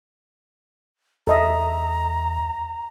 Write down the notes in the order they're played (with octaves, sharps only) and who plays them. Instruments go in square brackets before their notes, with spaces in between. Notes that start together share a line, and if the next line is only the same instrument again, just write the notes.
[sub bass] E2 [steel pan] A4 D#5 E5 [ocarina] A#5